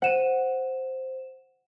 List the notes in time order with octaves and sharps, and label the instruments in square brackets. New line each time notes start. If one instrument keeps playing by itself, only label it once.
[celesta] C5 E7 [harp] F#5 D#7